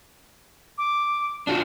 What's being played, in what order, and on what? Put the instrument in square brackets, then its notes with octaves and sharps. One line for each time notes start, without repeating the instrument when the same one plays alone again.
[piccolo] D6
[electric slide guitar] D4 F4 F#4